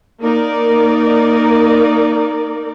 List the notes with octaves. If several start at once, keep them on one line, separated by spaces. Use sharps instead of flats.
A#3 D#4 A#4 D5